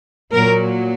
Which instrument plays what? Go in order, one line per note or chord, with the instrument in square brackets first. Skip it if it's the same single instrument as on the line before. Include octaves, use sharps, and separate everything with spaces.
[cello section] A#2 F#3 A#4